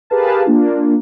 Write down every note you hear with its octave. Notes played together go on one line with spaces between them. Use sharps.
G4 G#4 A#4 B4 F5 A5
A#3 D4 F4